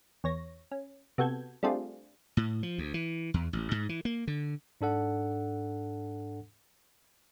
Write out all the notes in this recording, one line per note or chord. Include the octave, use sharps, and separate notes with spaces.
E2 C#5 A#6
C#4
C3 B3 F#4 A4 G6 G#6
G3 A3 C4 D4 F4 G#4
A2
F3
D2
E3
E2
A1
G#2
E3
A#3
D3
G#2 D4 A4 F#5